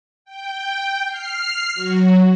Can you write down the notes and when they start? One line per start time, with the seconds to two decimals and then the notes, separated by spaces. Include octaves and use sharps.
0.25 G5
1.06 F6 C7
1.75 F#3 F#4